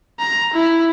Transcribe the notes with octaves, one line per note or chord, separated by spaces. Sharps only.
A#5
E4